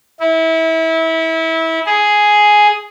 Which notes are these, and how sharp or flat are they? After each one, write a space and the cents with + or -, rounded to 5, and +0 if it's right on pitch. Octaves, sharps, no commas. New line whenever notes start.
E4 -25
G#4 +5